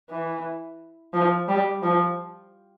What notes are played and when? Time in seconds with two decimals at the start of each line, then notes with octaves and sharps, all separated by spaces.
0.10 E3
1.13 F3
1.48 G3
1.82 F3